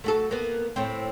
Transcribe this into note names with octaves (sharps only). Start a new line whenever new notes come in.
A3 F#4 A4
A#3 B3
A2 C4